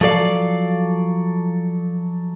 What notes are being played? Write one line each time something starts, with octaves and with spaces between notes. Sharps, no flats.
F3 F#3 A4 D5 F5